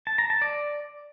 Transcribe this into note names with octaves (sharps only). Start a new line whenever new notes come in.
A5
A#5
A5
D5